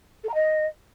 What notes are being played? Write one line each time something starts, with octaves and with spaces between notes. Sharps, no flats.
A4
A#5
D#5